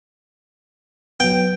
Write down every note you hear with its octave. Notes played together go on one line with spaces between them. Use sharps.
F#3 B3 G5